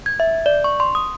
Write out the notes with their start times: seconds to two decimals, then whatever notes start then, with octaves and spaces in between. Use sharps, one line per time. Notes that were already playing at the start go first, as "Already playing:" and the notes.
0.06 G#6
0.20 E5
0.46 D5
0.64 C#6
0.80 C6
0.95 D#6